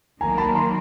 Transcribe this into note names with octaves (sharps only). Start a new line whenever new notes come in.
D#3 F#3 A#3 G#5 A#5
A5 B5
A#5 C6